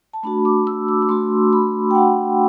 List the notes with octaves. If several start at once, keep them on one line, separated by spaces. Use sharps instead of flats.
A5
A3 D4 F#4 B5
D6
E6
D6
D6
A3 D4 F#4 C6
B5
G5
A3 D4 F#4 F#5